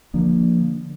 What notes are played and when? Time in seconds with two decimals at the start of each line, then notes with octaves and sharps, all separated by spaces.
0.14 D3 F3 A#3 D4